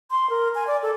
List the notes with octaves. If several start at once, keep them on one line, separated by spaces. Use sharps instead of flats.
C6
A#4
G#5
D5
A4